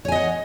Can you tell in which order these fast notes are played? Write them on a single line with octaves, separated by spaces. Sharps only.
C#5 G#5 D#5 F#5